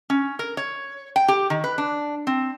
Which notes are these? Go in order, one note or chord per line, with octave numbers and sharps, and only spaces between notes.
C#4
A#4
C#5
G5
G4
D#3
B4
D4
C4